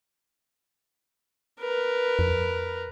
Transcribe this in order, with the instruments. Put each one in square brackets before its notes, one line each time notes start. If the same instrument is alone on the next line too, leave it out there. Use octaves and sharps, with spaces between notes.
[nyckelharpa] A#4 B4
[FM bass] F2